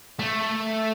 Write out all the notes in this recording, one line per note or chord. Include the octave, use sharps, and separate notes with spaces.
A3